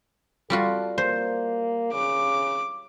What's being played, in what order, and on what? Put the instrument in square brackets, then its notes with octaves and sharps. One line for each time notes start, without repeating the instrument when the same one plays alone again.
[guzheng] G3 F4 F#4 [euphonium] A4
[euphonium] A#3 [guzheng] C5
[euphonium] C#3 [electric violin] D6